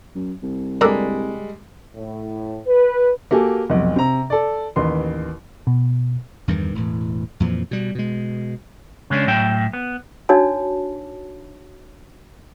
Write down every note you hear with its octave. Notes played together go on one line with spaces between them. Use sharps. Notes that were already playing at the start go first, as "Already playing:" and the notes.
F#2
C2
D3 G3 G#3 A#3 D4 A4 A#4
A2
B4
A#3 F#4 G4 A4 G#5
F1 B1
C3 A#5
A4 D5
A1 D#2 B4 C6
B2
E2 G2 D#3 E3
E1 A2 E3
F2 A#2 E3 F3
B2 G3
B2 G#3
C#3 G#3 C#4 D4
A2 F#3 E5 G5
B3
D4 D#4 F#4 C#5 A5